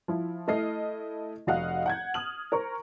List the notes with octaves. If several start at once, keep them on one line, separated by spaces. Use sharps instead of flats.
F3 E4
A3 E4 A4 D#5 F6 C7
F1 F#4 D#5 F5 F#5 F#6
F#5 G6 G#6
D#6 F6 F#7
A#4 C5 A#5 C#6